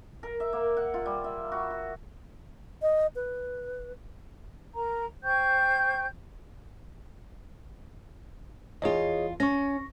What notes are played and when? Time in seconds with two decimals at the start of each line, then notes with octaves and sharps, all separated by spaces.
0.23 A#4
0.40 E5
0.53 A#3
0.77 F#5
0.94 F4
1.06 G3
1.24 E5
1.52 F#4
1.70 F#4
2.82 D#5
3.16 B4
4.75 A#4 A#5
5.23 C5 G5 C#6 G6
8.82 E2 F4 G#4 C#5 D#5
9.40 C#4 C#6 A#6